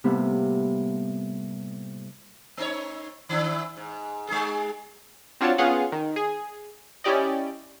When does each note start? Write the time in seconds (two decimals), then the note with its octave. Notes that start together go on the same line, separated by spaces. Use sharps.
0.04 A2 C3 G3 A#3 B3 E4
2.57 A#3 D#4 C#5
3.29 D#3 D4 E4
3.77 G#2
4.28 G#3 D#4 G#4
5.41 C4 D4 F4 F#4 C#5 A5
5.58 B3 C#4 F4 G#4 F5 F#5
5.92 D#3
6.16 G#4
7.04 C#4 E4 G4 D5 D#5